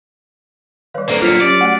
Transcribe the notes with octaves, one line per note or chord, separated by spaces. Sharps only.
D#3 G3 B4 C#5 F5
D3 A#3 A4 C5 D5
F#3 F4 F6 B6 C#7
F#3 C#4 G4 D5
A3 F#4 F#5 G#5